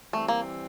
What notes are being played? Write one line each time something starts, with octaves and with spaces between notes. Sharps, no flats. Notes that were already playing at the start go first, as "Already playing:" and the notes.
E3 G3 A3 C4
A#3